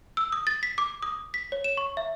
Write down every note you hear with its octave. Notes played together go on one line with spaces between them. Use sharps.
E6
D#6
A6
B6
D6
D#6
B6
C#5
E7
C#6
E5